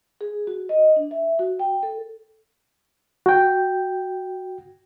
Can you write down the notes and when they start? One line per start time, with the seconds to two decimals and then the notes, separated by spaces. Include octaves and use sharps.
0.21 G#4
0.47 F#4
0.69 D#5
0.96 D4
1.11 E5
1.39 F#4
1.59 G5
1.83 A4
3.26 F#4 G5